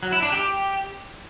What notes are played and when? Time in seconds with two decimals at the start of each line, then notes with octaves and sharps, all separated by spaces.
0.03 F#3
0.12 E4
0.22 D4
0.32 G4